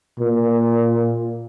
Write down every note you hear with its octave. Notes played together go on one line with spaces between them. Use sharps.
A#2